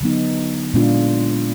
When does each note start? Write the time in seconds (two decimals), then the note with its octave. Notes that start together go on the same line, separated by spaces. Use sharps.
0.01 D3 F#3 B3 D#4
0.74 A#2 G#3 B3 D4 F4